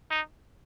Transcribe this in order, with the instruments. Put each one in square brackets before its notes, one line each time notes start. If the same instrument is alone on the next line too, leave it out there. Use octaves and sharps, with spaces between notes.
[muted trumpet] D#4